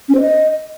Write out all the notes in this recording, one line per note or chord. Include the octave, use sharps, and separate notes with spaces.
C#4
C5
D#5